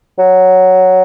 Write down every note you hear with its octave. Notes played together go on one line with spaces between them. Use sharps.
F#3